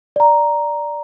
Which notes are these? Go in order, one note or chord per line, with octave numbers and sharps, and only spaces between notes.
D5 A#5